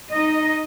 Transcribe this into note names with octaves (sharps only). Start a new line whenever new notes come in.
D#4 D#5